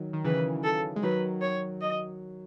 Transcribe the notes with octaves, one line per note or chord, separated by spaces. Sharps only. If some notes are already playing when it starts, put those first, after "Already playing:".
Already playing: D#3 F#3
D#3
C#3 E3 B4
A4
G#3
D#3 F#3 B4
C#5
D#5